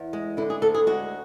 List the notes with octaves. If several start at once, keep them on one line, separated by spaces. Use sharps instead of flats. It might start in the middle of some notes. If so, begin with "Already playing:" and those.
Already playing: E2
G#3
D3 E4
G#4
D2 A4
G#4
G#3 F#4